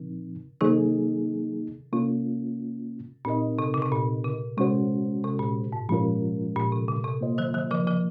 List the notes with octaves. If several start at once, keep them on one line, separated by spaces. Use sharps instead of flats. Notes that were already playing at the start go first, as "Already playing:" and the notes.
Already playing: A#2 C#3 F3 C4 D#4
C3 D#3 F#3 A#3 D#4 G#4
C3 A#3 C#4 F4
A#2 C4 D#4 A#4 D#5
C3
C#3
C3
A#2
C#3
C3 G#3 C#4 F#4 C5
C3
A#2
G#2
A#2 F3 G#3 C#4 F4 A#4
A#2
C3
C#3
C3
A#3 F4 C5 D#5
D#3 F#3
D#3 F#3
C#3 F3
C#3 F3